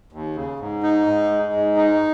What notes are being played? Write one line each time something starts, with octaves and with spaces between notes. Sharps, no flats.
D#2
C#3
G#2
D#4
G#2
G#3
G#2
D#4